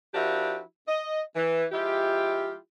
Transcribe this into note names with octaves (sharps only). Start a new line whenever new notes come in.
F3 D4 E4 F#4 G4 A#4
D#5
E3
F3 G#3 E4 F4 G4